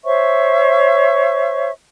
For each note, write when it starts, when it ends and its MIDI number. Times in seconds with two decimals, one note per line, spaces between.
0.05 1.70 72
0.05 1.70 73
0.05 1.70 76
0.05 1.70 85